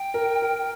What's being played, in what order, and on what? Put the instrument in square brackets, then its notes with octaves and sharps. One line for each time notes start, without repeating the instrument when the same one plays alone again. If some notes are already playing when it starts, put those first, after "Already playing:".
Already playing: [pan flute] G5
[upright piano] A#4
A#4